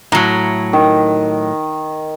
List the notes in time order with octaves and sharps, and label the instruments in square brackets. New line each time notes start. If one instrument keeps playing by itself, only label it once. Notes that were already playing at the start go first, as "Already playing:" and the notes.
[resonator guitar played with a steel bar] A2 F#3 [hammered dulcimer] A#5
[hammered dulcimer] D#3